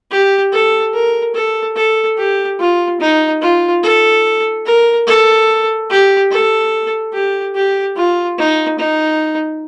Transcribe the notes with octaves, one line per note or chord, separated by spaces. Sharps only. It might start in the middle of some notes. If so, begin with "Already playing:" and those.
G4
A4
A#4
A4
A4
G4
F4
D#4
F4
A4
A#4
A4
G4
A4
G4
G4
F4
D#4
D#4